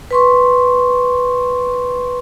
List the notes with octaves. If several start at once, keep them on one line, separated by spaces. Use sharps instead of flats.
B4 C6 C#6